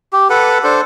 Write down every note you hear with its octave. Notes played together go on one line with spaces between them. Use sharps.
G4
A4 B4 F#5
D4 A4 C5